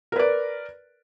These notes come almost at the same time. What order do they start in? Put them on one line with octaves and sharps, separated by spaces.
A#4 B4 D5